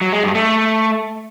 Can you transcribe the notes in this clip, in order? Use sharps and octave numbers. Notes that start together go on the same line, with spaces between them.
F#3
G#3
G2
A3